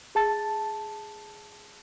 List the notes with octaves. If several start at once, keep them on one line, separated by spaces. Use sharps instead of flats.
G#4 A5 A6